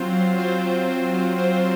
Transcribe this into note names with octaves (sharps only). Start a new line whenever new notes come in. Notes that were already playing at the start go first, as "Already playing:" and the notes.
Already playing: F#3 C4 F4 C5
F#3
C4 F4 C5
F#3
C4 F4 C5
F#3
C4 F4 C5